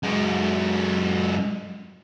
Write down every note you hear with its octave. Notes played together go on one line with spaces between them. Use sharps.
F#2 G#3